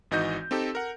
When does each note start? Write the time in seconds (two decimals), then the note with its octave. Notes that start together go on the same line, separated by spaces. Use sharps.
0.11 G#1 E3 D#4 F#4 D#5 G6
0.51 C4 D#4 G4 A4
0.75 A#4 F#5